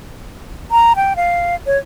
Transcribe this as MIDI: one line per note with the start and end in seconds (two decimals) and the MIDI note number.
0.71 0.93 82
0.96 1.13 79
1.16 1.55 77
1.66 1.77 73